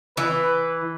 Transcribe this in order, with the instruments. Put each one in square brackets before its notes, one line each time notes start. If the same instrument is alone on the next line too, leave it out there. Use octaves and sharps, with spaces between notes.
[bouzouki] E3 [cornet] B4